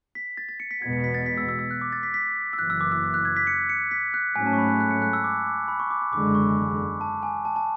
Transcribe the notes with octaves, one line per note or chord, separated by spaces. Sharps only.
B6
A6
A6
C#7
B6
E2 B2 G#3 B3 G#6
C#7
B6
A6
B6
E6
E6
E6
F#6
D6
A6
B6
B6
E6
F#1 F#2 E3 F#6
E6
D6
E6
E6
F#6
G#6
B6
C#7
C#7
B6
F#6
G#2 F#3 A3 C#4 G#5
A5
C#6
B5
F#6
F#6
C#7
F#6
E6
D6
D6
B5
C#6
D6
D6
F#1 E2 D3 G#3 D6
C#6
A5
G#5
A5
A5